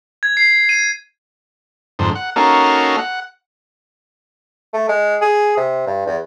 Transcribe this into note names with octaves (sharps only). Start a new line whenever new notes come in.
G#6
C7
D#7
F2 G#2 D3 C5
F#5
A#3 C#4 D#4 F#4 A4 F5
F#5
A3
G#3
G#4
C3
G2
E2